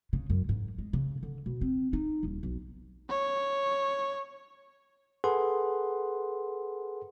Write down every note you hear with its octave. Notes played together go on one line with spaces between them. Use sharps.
C#3
F#2
G#2
G#3
C#3
D3
B2
C4
D#4
D#1
B1
C#5
G#4 A4 B4 F#5 C6